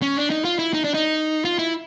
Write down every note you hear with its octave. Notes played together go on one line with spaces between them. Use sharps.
C#4
D4
D#4
F4
E4
D#4
D4
D#4
F4
E4